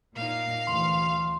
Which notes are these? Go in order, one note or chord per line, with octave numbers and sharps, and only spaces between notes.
A#2 A#3 D#4 F5
D2 E3 C6